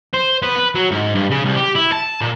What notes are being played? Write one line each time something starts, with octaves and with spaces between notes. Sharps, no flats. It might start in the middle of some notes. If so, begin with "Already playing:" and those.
C5
B3
B4
F#3
G#2
G2
C#3
C2
G4
E4
A5
A#2